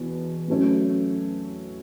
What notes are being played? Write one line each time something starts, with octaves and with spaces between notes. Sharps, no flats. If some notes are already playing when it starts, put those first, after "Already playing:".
Already playing: E2 B2
A2 F#3 A3 C#4